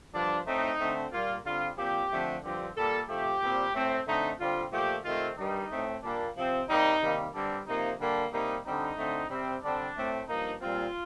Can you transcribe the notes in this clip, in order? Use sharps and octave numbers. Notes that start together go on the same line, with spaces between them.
G2 D3 F3 D4
A2 A3 C4 D#4
D3 A3 C4
A#2 G3 A#3 F4
D3 G3 C4 F4
A#2 F3 C4 G4
D3 F3 A3 C4
G2 D3 F3 C4 G4
A#2 G3 A#3 A4
C3 F3 A3 G4
A#2 G3 C4
A2 A3 C4
D3 A3 C4 D#4
D3 G3 C4 F4
A#2 F3 A3 G4
C3 D#3 A3 C4 F4
G2 D#3 G3 D#4
A2 A3 C4
A#2 G3 A#3 D4
C3 F3 C4
C3 G3 A#3 D#4
C3 D#3 G3 A#3
G2 D3 G3 C4 D4
C3 F3 A#3 D#4
D3 G3 A#3 D4
C3 G3 A#3 D#4
D3 G3 C4 D#4
D3 A3 C4
C3 G3 C4
D3 G3 C4 D4
A2 A3 C4
G2 F3 A#3 D#4
A#2 G3 C4 F4